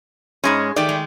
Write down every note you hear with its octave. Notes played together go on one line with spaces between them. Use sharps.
G#2 G#3 C#4 G#4
D#3 A3 G4 D5
G#3